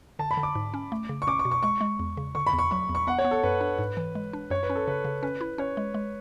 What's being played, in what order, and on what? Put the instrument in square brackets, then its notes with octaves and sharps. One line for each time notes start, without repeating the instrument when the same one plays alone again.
[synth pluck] D3 [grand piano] A5
[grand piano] B5
[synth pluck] D3
[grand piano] D6
[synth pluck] G#2
C#4
A3
C#3
[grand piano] C#6
[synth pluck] C#4 [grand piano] D6
[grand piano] C#6
[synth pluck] B2
[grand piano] C#6
[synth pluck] G#3 [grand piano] C#6
[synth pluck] G#3
E2
C#3
[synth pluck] D3 [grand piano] C#6
[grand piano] B5
[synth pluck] E2
[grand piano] C#6
[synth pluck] F#3 [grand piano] C#6
[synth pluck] E2
[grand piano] C#6
[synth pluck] B3 [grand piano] F#5
[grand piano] C#5
[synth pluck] B3
[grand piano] A4
[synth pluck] F#2 [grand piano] B4
[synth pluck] D4
G#2
E3
G#3
D4
[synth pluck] F#2 [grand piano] C#5
[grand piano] B4
[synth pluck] C#4
[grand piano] A4
[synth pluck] C#3 [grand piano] B4
[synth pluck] C#3
[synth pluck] C#4 [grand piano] B4
[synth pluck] E4
[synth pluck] C#4 [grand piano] C#5
[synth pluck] G#3
G#3